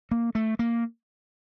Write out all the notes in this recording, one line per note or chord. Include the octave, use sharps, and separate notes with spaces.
A#3
A3
A#3